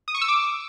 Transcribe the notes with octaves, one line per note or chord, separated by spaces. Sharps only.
D#6
C#6
E6
D6